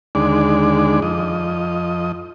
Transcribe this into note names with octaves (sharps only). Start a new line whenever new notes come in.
D#2 D3 G#3 D5
F2 D#5